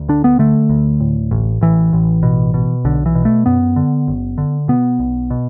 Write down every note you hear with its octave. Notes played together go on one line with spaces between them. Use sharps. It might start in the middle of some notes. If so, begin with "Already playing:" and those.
Already playing: D2
D3 D4
B3
D3 A3
D2
A2
A1
A1 E3
A1
B2
B2
B1 D3
E3
B2
A3
F#2 B3
D3
F#1
D3
B2 B3
B1
B2